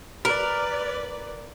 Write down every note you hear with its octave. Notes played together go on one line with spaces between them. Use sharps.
A#4 B4 D5